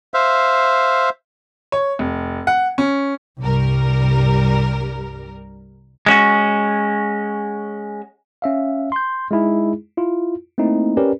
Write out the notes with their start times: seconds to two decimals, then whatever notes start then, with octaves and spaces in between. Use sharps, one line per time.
0.14 C5 E5 F5
1.72 C#5
1.99 F1
2.47 F#5
2.78 C#4
3.42 C2 G2 G3 A#4
6.06 G#3 C#4 F#4
8.42 C#4 E5 F5
8.92 C6 G6
9.31 G#3 D#4 E4 G#4
9.97 E4 F4
10.58 A3 A#3 C4 D#4 E4
10.97 C#4 G4 A#4 B4 D5